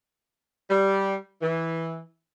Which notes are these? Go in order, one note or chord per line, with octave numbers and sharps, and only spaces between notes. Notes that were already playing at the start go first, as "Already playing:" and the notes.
G3
E3